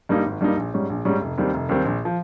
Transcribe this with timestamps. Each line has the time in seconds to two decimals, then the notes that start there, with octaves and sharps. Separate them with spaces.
0.09 G2 G3 A#3 D#4
0.26 G#1
0.41 G2 G3 A#3 D#4
0.57 A#1
0.74 G#2 G3 C#4
0.90 A#1
1.05 G#2 G3 C#4
1.21 F1
1.38 D#2 D#3 G3 C4
1.54 F1
1.69 D#2 D#3 G3 C4
1.85 A#1
2.05 F3